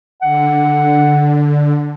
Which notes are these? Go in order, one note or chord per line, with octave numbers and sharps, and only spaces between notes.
D3 F#5